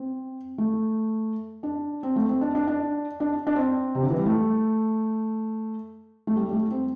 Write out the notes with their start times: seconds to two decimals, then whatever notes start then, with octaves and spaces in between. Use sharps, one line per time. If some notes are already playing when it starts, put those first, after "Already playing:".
Already playing: C4
0.58 A3
1.63 D4
2.03 C4
2.16 A3
2.29 C4
2.41 D4
2.55 D4
2.68 D4
3.20 D4
3.47 D4
3.56 C4
3.95 C3
4.02 D3
4.10 E3
4.18 G3
4.26 A3
6.27 A3
6.36 G3
6.49 G3
6.53 A3
6.71 C4